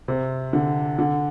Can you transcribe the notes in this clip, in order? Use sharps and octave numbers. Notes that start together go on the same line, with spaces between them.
C3
D3
D3